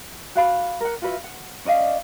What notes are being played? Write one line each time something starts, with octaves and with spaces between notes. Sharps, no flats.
F#4 F5 B5
A#4 F#5
F4 F#4 B4 E5
F#5
C#4 D5 D#5 F5